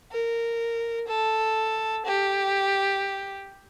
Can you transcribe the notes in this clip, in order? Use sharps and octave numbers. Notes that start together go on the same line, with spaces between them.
A#4
A4
G4